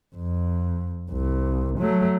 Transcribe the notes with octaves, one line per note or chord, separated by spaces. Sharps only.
F2
C2
F#3 A3